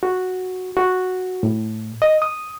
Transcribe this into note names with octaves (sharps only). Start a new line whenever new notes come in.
F#4
F#4
A2
D#5
D#6